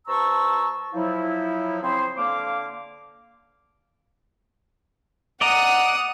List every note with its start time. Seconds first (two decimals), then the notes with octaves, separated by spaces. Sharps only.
0.07 G2 C5 A5 A#5 C#6 E6
0.93 F3 F#3 E4
1.82 C#3 C4 E4 G#4 C5
2.17 D3 A#3 F5 D6
5.41 D5 D#5 F#5 A#5 D#6